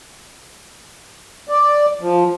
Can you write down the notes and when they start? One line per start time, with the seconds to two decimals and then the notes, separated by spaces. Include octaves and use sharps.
1.49 D5
2.01 F3